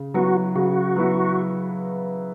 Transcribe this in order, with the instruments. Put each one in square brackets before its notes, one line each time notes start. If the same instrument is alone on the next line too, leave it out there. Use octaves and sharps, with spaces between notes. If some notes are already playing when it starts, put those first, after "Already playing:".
Already playing: [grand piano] C#3
[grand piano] F#3 B3 E4 [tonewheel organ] F#4
[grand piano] C#3 [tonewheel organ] F#4
[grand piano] F#3 B3 E4